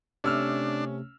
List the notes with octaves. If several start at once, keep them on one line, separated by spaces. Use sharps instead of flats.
C3 A3 C#4 D4 E6 F6